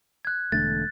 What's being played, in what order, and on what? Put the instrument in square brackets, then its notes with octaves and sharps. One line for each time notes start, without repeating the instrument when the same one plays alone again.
[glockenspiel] F#6 G#6
[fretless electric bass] E1 D3 A3 [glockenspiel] A6